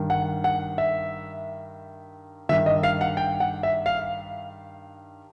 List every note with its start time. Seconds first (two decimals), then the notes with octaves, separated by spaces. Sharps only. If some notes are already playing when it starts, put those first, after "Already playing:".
Already playing: G2 D#3
0.10 F#5
0.44 F#5
0.78 E5
2.49 G2 D#3 E5
2.66 D#5
2.83 F5
3.01 F#5
3.17 G5
3.40 F#5
3.63 E5
3.86 F5